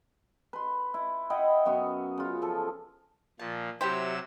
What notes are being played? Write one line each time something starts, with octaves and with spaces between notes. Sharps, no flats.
B4 C6
E4
E4 D#5 F#5 G5
F#2 B3 F#4 F5
C#3 F4
F3 A4
A#2 F3 A5
C3 F#3 E4 G4 C5 G5 E6